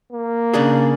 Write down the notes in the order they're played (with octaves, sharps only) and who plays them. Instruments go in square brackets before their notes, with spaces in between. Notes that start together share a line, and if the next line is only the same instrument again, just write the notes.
[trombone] A#3
[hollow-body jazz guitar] C#3 D4 G#4